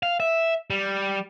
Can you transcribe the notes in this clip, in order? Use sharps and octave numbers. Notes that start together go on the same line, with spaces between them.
F5
E5
G3